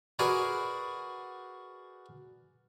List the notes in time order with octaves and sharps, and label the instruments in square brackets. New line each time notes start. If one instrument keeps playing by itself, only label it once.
[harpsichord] F#4 G#4 A#4 B4 D5